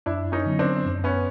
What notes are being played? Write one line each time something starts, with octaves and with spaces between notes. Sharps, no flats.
F#2 D4 E4
C#4 D#4
D3 F#3 B3
C4 D4
F#2
B3 C#4